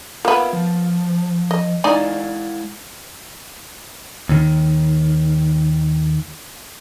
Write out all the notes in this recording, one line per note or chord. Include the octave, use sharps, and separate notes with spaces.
A#3 B3 F4 E5
F3
D#5
G#3 D#4 E4 D5 F5 G#5
D#2 D#3